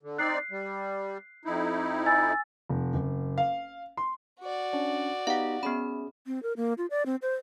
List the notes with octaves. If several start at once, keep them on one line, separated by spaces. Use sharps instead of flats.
D3
C4 D#4 D5 F#6 C7
G3
F2 D#4 E4
G#5 E6 A6
F1
F#1
F5
C6
F#4 D5
C#4 D4
B3 D#4 G4 F5 F#5
B3 C#4 G#4 B5
C4
A#4
A#3
F4
D5
C4
C5